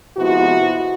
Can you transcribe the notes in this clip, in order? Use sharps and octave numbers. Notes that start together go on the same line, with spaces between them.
C3 F3 G#3 B3 E4 F#4